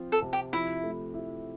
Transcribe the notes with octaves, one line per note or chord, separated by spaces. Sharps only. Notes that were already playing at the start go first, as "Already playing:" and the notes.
Already playing: F3 C4 F4
A4
C3
G4
F3 E4
A3
E4